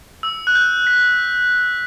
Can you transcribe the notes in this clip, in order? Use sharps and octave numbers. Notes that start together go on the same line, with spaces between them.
E6
F#6
G6
B6